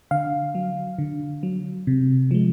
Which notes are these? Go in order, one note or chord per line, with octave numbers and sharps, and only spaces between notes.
D3 F5
F#3
D3
F#3
C3
F3 G#3